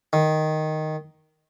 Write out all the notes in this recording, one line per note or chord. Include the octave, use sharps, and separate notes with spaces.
D#3